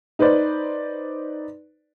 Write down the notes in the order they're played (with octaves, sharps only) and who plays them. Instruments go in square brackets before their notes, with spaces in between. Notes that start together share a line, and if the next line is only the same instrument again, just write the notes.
[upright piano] D#4 B4 C5 D5